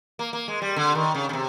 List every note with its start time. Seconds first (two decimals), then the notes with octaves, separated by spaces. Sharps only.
0.19 A#3
0.33 A#3
0.48 G#3
0.62 G3
0.76 D3
0.95 D#3
1.15 C#3
1.29 C#3
1.33 C3